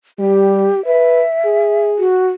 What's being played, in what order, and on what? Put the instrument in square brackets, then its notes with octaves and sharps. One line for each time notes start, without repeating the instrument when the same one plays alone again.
[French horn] G3 [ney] G4
[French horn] B4 [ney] E5
[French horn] G#4
[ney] F#4